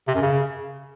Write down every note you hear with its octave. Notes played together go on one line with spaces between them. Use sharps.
C3
F#2
C#3